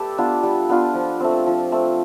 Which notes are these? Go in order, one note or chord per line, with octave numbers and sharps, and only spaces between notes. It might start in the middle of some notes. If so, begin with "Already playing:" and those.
Already playing: A3 G4 A4 B4 D5
B3 D4 F4
G3
B3 D4 F4
F3
A3 C4
F3
A3 C4